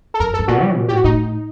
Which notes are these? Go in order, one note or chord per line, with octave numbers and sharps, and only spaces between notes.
A4
F#2 A#4
A4
G2
A#2 F#4
G3
A#2
A2 G4
F#4
A2 D#4